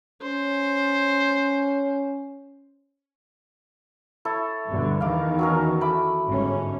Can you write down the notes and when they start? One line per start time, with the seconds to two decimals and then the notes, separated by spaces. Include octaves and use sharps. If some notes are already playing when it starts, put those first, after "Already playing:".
0.22 C#4 C5
4.25 E4 A4 C#5
4.68 G2 B2 D3
5.00 E2 D#3 E3 F5 D6
5.39 F#3 C#4 A#4
5.81 A3 B5 D6
6.26 G1 G#2 C#4